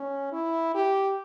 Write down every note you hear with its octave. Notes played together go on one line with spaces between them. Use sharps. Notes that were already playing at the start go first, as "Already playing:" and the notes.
Already playing: C#4
E4
G4